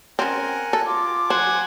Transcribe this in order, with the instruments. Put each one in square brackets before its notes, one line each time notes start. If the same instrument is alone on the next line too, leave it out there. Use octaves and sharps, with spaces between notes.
[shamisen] C4 C#4 [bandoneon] A#4 F#5 G#5
[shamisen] A4
[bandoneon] F4 [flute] D6
[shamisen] C5 [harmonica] F#5 G#5